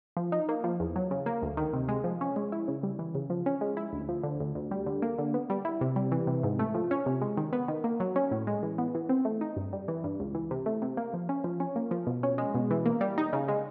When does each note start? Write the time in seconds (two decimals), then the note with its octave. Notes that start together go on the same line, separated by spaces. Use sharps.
0.17 F3
0.32 D#4
0.49 A#3
0.64 F3
0.80 E2
0.96 F#3
1.11 C#3
1.26 A#3
1.42 D2
1.57 D#3
1.74 C3
1.88 G#3
2.04 F3
2.21 C#4
2.36 G#3
2.52 E4
2.68 C#3
2.83 G3
2.99 E3
3.15 C#3
3.30 F3
3.46 C#4
3.61 G#3
3.77 E4
3.93 D2
4.09 F3
4.23 D3
4.40 D2
4.55 D2
4.71 G3
4.86 D3
5.02 A#3
5.19 D3
5.34 B3
5.50 G3
5.65 E4
5.81 C3
5.96 G3
6.12 E3
6.27 C3
6.43 G#2
6.59 A3
6.74 F3
6.91 C#4
7.06 C3
7.21 G#3
7.37 D#3
7.53 B3
7.68 D#3
7.84 A#3
8.00 F#3
8.16 C#4
8.31 A2
8.47 G#3
8.63 E3
8.78 B3
8.95 E3
9.09 C4
9.25 A3
9.41 D#4
9.57 G2
9.73 G3
9.88 E3
10.04 G2
10.20 C#2
10.35 E3
10.51 C3
10.66 A3
10.82 C3
10.97 A#3
11.14 F3
11.29 C#4
11.44 F3
11.60 C#4
11.76 A#3
11.91 F3
12.07 B2
12.23 C#4
12.38 G#3
12.55 B2
12.71 E3
12.86 A#3
13.01 G3
13.18 D#4
13.33 C#3
13.48 G#3